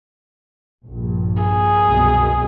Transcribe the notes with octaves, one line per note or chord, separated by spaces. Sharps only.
A#1 G2
G#4
C2 F#2 B2